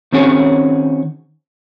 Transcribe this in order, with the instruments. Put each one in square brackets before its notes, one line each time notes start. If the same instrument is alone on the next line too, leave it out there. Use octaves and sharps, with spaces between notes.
[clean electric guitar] D#3 C4 C#4 F#4 G#4 C#5